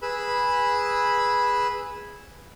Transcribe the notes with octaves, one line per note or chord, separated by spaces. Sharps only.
G#4 B4 B5 E6